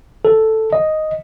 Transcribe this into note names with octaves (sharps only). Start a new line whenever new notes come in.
A4
D#5